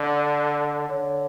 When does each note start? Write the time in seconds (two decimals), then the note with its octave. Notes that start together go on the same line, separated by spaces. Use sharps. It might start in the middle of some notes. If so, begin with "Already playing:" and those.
Already playing: D3 D5
0.89 D3 C#5